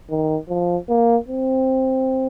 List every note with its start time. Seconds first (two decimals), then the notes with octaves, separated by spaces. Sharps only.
0.10 D#3
0.49 F3
0.89 A#3
1.28 C4